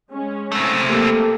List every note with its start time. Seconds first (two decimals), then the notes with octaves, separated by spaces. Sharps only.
0.12 G#3 C#4
0.52 A3 C4
0.88 A#3 G4 A4